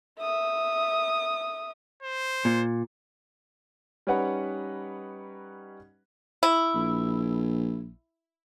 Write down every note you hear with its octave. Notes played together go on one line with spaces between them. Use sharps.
E5 D#6
C5
A#2
G3 C#4 D#4 B4 F#5
E4
A#1